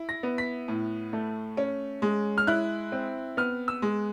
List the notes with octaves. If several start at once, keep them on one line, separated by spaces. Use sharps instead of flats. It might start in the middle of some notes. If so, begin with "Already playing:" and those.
Already playing: E4
A#6
B3
B6
A2
A3
C#4
G#3
F6
E4 F#6
C4
B3 F6
E6
G#3